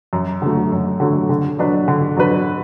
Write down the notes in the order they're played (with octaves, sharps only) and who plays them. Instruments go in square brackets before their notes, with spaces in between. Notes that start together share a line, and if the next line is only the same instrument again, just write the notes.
[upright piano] F#2
D3 F#3 A3
F#2
D3 F#3 A3
D3
F#3 D4 B4
D3
F#3 D4 B4